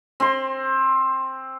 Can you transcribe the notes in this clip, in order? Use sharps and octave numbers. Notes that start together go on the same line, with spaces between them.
C4 C6